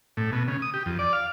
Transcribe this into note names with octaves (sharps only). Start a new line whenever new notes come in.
A2
B2
C#3
D#6
G4
F2
D5
F5